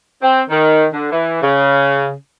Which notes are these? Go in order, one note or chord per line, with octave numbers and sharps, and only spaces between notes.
C4
D#3
D3
E3
C#3